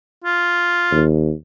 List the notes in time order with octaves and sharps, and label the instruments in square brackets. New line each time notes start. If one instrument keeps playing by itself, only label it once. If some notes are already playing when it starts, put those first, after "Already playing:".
[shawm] F4
[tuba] D#2